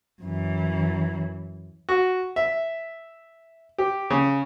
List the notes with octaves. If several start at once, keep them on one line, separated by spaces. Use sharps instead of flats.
F#2 E3
F#4
E5
G4
C#3